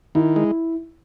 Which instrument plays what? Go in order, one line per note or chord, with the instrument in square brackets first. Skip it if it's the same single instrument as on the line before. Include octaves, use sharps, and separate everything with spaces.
[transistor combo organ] D#3 [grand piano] E4
[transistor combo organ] G#3